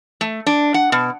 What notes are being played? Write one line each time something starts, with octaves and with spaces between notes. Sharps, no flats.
A3
D4
F#5
B2